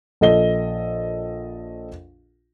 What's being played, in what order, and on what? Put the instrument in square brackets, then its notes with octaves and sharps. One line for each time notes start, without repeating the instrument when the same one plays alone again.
[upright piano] A#1 A4 D#5 G7